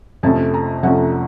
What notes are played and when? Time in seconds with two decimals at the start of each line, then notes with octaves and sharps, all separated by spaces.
0.23 F2 C3 F3 A3 C#4 A5
0.54 A#5
0.83 F2 C3 F3 A3 C#4 F#5